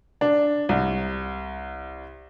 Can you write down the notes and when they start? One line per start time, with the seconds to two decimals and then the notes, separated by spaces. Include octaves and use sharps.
0.21 D4
0.69 C2